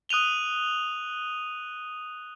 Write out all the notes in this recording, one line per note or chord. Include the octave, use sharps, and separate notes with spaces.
D#6 F#6 D#7 F7 G7